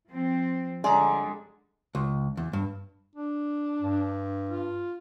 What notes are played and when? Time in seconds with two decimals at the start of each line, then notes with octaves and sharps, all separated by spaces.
0.10 F3 C4
0.84 D3 G3 G#3 D5 A#5
1.95 C#2
2.37 E2
2.53 G2
3.15 D4
3.81 G2
4.49 F4